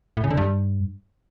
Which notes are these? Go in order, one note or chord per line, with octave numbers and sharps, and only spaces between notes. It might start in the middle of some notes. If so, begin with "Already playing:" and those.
A2
C#3
D3
G2